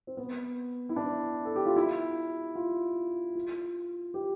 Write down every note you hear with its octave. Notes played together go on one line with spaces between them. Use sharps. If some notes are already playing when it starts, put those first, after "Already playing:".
C4
B3
E4
D4
A4
G4
F4
E4
F4
F4
G4